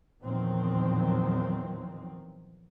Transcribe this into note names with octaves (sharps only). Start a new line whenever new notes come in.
E2 A#2 D#3 F3 F#3 C4